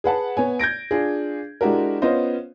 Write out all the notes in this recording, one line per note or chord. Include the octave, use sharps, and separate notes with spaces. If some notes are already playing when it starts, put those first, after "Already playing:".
G#4 B4 F#5 A5
B3 C#5 G#5
G6 G#6 A#6 D7
D4 F4 G#4
G#3 D4 E4 F#4 G4 A#4
B3 C#4 F4 C5 D#5